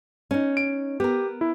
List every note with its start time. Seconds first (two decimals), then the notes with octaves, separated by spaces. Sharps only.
0.31 C#4 D#4
0.57 D7
1.00 B3 G4 A#4
1.41 E4